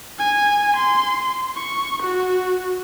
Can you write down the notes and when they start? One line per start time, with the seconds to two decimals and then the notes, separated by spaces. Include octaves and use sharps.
0.19 G#5
0.77 C6
1.55 C#6
2.03 F#4